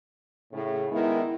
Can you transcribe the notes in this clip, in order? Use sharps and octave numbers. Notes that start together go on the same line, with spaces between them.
A2 C#3
D#3 G#3 B3 E4